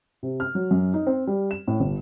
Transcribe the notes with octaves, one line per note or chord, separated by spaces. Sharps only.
C3
F6
F#3
F#2
D#4
C4
G3
E7
A2
G1